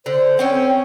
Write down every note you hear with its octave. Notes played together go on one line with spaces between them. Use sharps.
D3 C5
C4 C#4 C#5 G5